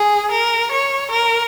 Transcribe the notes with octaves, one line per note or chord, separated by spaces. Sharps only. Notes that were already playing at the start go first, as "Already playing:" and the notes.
Already playing: G#4
A#4
C#5
A#4